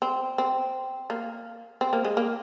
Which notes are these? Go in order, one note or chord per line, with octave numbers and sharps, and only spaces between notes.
C4
C4
A#3
C4
A#3
G#3
A#3